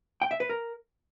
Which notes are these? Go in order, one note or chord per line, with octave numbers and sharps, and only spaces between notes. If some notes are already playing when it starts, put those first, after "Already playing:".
G5
E5
B4
A#4